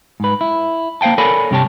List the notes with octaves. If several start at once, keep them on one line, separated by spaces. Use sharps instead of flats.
G#2 B4
E4
A#3 C5 F5 G5 A5
A4 A#4 C#5 D5 G#5 B5
G2 C3 G4 C#5 A5